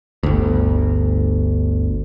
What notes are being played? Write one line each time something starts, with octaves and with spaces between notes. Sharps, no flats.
G1 D2